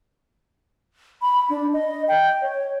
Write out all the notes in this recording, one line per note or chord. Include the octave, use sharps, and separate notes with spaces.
B5
D4
D#5
G5
C#5